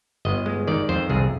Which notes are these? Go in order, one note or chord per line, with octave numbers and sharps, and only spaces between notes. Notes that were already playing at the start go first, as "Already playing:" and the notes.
G1 D#5
G#3
D#3 D5
F2 C5
C2 G#4